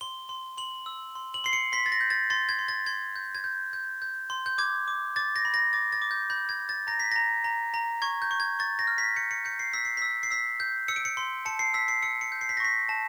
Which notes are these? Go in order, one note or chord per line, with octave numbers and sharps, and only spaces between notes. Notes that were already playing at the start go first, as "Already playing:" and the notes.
C6 G7
C6
C6 F#7
E6
C6
F#7
C6 C7
C#7
C6 B6
A6
A#6
G6
A6
C6 A6
G#6
C6
A6
C6 G#6
G6
G#6
G6
G6
G6
C6
G6
D6 G#6
D6
D6 A6
A#6
B5
A#6
D6 A6
A6
D6
G6
B5 G6
G#6
B5
A6
A#5 A#6
B6
A#5 A#6
A#5
A#5
C#6 G#6
G6
C#6
G#6
C#6 A6
A#6
F6
B6
G6 C#7
C#7
G6 C#7
C7
E6 B6
C7
E6 B6
C7
E6 B6
G6
E6 C#7
D7
C#7
C6
A5 C#7
C7
E6 B6
C7
E6 C#7
C#7
G6
C7
B6
A#6
C#6 B6
A5